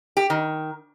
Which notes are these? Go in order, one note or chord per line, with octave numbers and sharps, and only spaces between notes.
G4
D#3